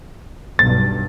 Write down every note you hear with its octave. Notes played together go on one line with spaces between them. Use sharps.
B1 G2 A6